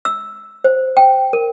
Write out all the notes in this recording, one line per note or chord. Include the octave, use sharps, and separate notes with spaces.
E6
C5
G5
A#4